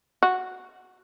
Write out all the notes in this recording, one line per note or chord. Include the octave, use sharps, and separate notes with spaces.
F#4